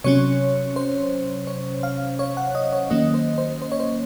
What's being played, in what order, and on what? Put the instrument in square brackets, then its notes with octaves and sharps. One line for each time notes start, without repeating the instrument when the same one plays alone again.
[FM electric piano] C3 F#3 C#4 C#5
C5
C#5
F5
C#5
F#5
D#5
C#5
D#3 F#3 A#3 C#4 D#5
C5
C5
C5
C#5
C5